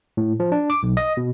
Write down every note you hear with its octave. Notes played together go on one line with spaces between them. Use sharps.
A2
F3
D4
D6
B1
D#5
B2